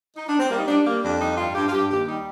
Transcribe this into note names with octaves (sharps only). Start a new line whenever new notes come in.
D#4
D4
C4
G3 A#3
D#4
G3 D4
G3 A#3
F2 D4
G3 D#4
G2 F4
G2 G4
F4
G2 G4
D#2 G4
G3 D#4